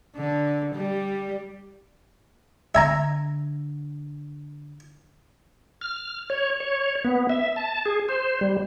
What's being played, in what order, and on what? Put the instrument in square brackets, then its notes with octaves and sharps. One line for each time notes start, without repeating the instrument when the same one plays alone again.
[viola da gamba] D3
G3
[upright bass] D3 [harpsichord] E5 G#5 A#5
[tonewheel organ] F6
C#5
C#5
B3
E5
A5
G#4
C5
G3